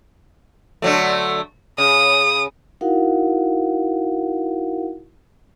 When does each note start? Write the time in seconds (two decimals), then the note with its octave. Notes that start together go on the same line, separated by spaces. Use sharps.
0.82 D3 F#3 A3
1.78 C#3 D#6
2.81 D#4 E4 F#4 A#4 F5 F#5